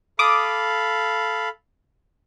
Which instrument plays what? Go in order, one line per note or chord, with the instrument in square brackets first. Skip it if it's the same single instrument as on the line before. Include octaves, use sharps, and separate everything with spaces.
[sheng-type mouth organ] A4 F5 B5 [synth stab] D6 D#6